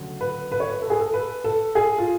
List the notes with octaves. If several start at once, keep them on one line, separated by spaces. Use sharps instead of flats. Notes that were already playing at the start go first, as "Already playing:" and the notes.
Already playing: D2 C#3 F#3 C#4
B4
B4
C#5
B4
A4
G#4
A4
B4
A4
G#4
F4